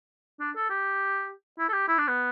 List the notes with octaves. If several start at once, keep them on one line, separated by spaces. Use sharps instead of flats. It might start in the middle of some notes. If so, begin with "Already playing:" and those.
D4
A4
G4
E4
A4
G4
E4
D4
B3